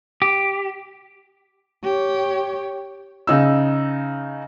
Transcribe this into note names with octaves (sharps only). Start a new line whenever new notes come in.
G4
G4 C#5
C#3 D#4 E6